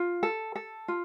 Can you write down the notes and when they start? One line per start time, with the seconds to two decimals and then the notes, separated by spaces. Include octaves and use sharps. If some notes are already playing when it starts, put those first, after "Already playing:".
Already playing: F4
0.23 A4
0.55 A4
0.88 F4